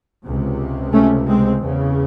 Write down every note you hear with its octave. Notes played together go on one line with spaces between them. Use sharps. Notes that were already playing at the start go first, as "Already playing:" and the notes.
C#2 C3
A3 C#4
G#3 C4
E2 C#3